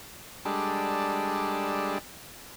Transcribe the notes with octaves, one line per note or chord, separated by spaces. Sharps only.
G3 G#3 D4 A4